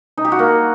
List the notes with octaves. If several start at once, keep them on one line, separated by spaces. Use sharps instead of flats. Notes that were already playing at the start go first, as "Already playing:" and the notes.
D#4
G4
F#4
A#3